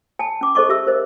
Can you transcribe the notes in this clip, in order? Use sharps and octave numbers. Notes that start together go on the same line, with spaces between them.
G#5 A5
C#4 D6
G#4 A4 C5 D#5 C#6 D6
G4 E5 E6
A#4 C5 D#5